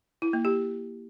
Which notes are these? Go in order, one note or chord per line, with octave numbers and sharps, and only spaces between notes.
E4
A#3
G4